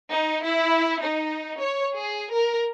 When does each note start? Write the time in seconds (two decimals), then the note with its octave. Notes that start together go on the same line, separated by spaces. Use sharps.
0.10 D#4
0.44 E4
1.00 D#4
1.59 C#5
1.95 G#4
2.31 A#4